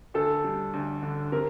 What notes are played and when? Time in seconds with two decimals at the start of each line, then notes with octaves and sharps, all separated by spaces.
0.14 D2 A4
0.44 G3
0.73 D2
1.02 D3
1.32 C3 A#4